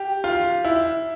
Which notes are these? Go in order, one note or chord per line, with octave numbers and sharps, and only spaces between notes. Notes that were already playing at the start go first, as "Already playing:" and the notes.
Already playing: G4
F4
E4